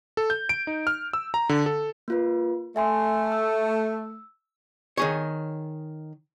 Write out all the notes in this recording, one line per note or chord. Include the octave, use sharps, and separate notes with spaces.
A4
G6
D7
D#4
F6
E6
A#5
D3
A4
A#3 F4 B4
A3 E5 G#5 C6
E6
D#3 G#4 C#5